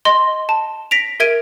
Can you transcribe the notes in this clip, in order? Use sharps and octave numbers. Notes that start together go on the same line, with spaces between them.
D#5 C6
A5
A#6 B6 D7 F7
A#4 E5 G#6 D7 D#7